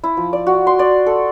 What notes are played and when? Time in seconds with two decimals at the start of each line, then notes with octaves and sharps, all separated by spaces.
0.04 E4
0.17 F3
0.33 D5
0.47 F#4
0.67 C6
0.79 D5
1.06 A4